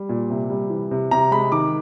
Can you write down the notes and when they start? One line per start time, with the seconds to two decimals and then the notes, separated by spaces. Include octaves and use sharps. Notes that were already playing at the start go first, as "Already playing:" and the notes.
Already playing: G3
0.09 A#2
0.30 C3
0.50 G3
0.70 E3
0.91 C3
1.11 C3 A#5
1.31 G#3 B5
1.52 D#3 D6